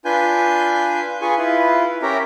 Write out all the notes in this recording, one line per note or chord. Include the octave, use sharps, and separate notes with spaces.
D4 F4 B4 G#5 G6
F4 G#4 B4 G#5 C#6
E4 F4 B4
C#4 G4 A#4 E5 A#5